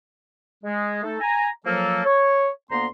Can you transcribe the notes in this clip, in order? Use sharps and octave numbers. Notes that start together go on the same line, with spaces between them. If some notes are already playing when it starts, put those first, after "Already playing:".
G#3
A3 D#4 A4
G#5 A#5
F3 F#3 A#3 A4
C#5
D2 A#3 B3 A#5 C6